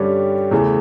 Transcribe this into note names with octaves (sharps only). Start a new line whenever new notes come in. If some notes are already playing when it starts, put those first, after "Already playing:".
Already playing: G2 D3 G3 C#4 G4
E2 C#3 E3 A3